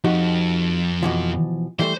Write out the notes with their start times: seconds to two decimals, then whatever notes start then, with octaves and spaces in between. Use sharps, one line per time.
0.04 F2 D#4 F#4 G4
1.03 B2 E3 F3
1.79 E3 G3 A3 C5